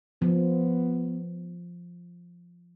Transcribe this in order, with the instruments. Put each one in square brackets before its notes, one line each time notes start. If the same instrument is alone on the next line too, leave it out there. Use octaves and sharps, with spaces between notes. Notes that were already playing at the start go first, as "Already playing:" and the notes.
[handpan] F3 [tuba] B3